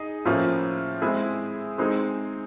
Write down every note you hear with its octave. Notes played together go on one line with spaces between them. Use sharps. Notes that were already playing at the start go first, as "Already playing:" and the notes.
Already playing: D#4 G#4 D#5
A2 F3 A#3 C#4 F4
G#3 C4 E4 G#4
G#3 C4 D#4 G#4